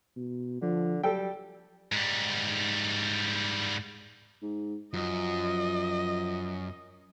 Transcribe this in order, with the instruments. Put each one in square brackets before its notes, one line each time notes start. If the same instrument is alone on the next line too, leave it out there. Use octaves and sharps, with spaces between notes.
[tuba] B2
[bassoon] D3 [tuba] F3
[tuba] F#3 [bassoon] G3 [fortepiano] A4 G5
[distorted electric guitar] G#2 G3
[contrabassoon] G#2
[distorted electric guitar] F#2 [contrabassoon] F3 [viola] D#5